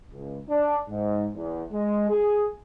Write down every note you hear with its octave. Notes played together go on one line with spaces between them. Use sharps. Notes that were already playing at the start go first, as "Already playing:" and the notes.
C#2
D4
G#2
E2
G#3
G#4